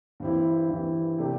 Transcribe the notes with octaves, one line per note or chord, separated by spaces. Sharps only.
G2 E3 C4 E4
G2 E3 C4 E4
C3 A3 D4 G4